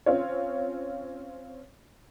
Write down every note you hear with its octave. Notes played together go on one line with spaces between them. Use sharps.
C4 C#4 F4 C#5